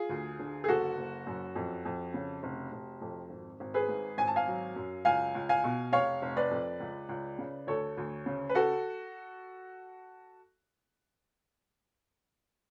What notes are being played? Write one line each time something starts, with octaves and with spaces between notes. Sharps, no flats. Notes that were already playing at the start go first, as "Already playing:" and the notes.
Already playing: F4 G#4
D2
D3
G#4
F#1 F#4 A4
F#1
F#2
F2
F2
C#3
F1
F1
F2
G#1
G#1
G#4 B4
G#2
G#1 G#5
A5
F5 G#5
F#3
F#2
C#2 F5 G#5
C#2
F5 G#5
B2
F1 C#5 F5
F1
B4 D5
F2
C#2
C#2
C#3
D2 A4 C#5
D2
C#3
B4
F#4 A4